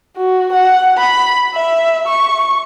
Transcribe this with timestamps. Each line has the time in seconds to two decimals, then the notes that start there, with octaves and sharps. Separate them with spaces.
0.17 F#4
0.52 F#5
0.97 B5
1.55 E5
2.07 C#6